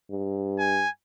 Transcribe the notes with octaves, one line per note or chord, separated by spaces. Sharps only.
G2
G#5